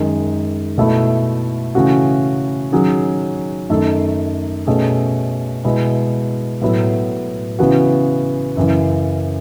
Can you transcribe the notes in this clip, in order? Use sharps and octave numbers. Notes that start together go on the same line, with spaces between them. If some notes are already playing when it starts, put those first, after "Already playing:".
Already playing: F#2 D#3 G#3
B2 A3 E4
C#3 E3 A3 C#4 F#4
D#3 F#3 C#4 G#4
F#2 D#3 A3 D#4 A4
B2 A3 C#4 G#4
B2 G#3 B3 E4
A2 F#3 B3 E4
C#3 E3 B3 F#4
F#2 C#3 E3